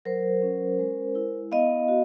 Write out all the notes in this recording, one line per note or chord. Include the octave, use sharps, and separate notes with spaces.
F#3 A#4 C5
C#4
G#3
E4
B3 D#5 F5
F#4